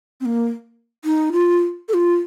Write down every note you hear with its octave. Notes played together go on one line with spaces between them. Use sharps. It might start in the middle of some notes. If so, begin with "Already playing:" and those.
C4
A#3
D#4
F4
A4
F4